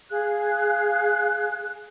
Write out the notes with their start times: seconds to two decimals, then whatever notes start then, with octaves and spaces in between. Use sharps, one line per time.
0.10 G#4 F5 F#6